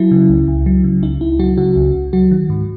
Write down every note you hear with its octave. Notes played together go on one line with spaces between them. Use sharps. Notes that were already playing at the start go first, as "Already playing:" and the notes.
Already playing: F#3 E4
C#3
C#2
C#2
F#3
C#3
C#2 D#4
C#2 E4
F#3 F#4
C#3 F#4
C#2
C#2
F#3 F#4
D#3
G#2